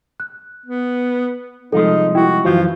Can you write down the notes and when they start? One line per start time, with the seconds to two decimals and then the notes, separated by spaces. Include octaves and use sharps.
0.20 F#6
0.66 B3
1.72 C2 F3 G#3 D#4 A4
2.15 E4 F#4 G5
2.45 F#2 E3 F3 F4 F#4 F5 G6